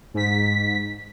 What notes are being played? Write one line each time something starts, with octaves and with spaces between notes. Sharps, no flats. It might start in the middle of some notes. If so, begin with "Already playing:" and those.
G#2 B6